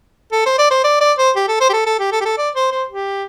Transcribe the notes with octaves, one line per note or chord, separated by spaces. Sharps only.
A4
C5
D5
C5
D5
D5
C5
G4
A4
C5
G4
A4
A4
G4
A4
G4
A4
D5
C5
C5
G4